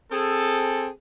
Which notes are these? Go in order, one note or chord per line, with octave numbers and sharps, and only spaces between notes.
C4 G#4 A4